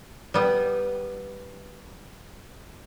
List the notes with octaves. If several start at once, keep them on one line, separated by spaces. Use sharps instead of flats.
G3 B3